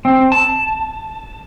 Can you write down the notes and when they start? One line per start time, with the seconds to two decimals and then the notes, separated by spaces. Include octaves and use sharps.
0.05 C4
0.32 A5